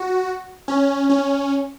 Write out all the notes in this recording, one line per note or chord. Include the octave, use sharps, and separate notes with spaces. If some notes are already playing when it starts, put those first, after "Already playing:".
Already playing: F#4
C#4
C#4